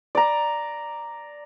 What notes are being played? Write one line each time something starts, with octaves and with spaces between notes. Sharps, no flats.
D5 A#5